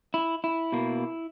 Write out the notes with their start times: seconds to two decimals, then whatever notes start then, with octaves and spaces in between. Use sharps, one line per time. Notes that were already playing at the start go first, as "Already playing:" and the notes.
0.14 E4
0.44 E4
0.72 B2 A#3